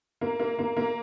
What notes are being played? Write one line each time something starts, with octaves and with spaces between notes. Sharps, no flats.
A#3
A#3
A#3
A#3